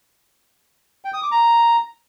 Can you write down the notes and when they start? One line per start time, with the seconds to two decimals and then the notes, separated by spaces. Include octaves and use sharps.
1.05 G5
1.14 D#6
1.23 D6
1.32 A#5